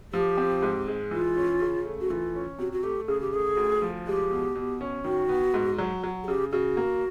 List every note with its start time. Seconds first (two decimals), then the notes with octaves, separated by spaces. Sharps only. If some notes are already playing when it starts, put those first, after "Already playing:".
0.13 F3 G4
0.38 C4
0.62 G#2
0.88 G#3
1.11 E3 F4
1.37 C#4
1.61 C#3
1.85 A3
2.01 F#4
2.10 E3 F4
2.35 C#4
2.59 C3 F#4
2.72 F#4
2.83 A3 G4
3.08 C#3 G#4
3.21 G4
3.33 A3 G#4
3.57 D2
3.82 F3
4.07 G#3 G4
4.31 B2
4.55 B2
4.81 C#4
5.04 D#3 F#4
5.29 B3
5.54 G#2
5.79 F#3
6.04 F#3
6.24 G#4
6.27 C#3 G4
6.52 C#3 F#4
6.77 A#3